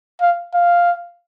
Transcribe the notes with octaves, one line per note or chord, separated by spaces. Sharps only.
F5
F5